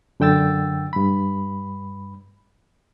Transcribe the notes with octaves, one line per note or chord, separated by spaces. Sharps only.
F#2 D3 G5 E6 A6
G2 B5